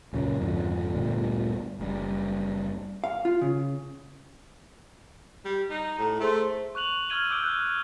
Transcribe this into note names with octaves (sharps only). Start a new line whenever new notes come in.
C#2 F#2 A#2 C#3
G#1 F2 D3
G1 D2 A#2 G3
F#1 G3
F5
F4
C#3
G3
D#4
A2 A#5
A3 G#4 C5 C6
C#6 F#6 F7 F#7
C#6 E6 F6 G#6 D#7 G7
D6 E6 G6 D7 G7
F#6 G7